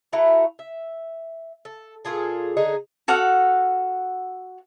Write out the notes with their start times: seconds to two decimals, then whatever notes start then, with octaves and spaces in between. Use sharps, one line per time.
0.13 A3 E4 F#4 A#5
0.59 E5
1.65 A4
2.05 A#2 F4 G#4 A4
2.57 D3 D#4 G#4
3.08 F#4 A4 F5 F#5